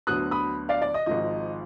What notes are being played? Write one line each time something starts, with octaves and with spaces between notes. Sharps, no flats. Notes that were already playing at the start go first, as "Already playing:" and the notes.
D2 D3 F#3 B3 D#6 F#6
B5 D#6
D5 F5
D5
D#5
G#1 G#2 F3 D#5